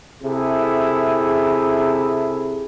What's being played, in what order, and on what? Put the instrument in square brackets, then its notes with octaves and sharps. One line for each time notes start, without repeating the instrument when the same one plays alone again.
[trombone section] C3 E4 G#4 A4